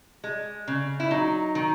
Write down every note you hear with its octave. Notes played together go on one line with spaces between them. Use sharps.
G#3
C#3
E4
F#3 D#4
D#3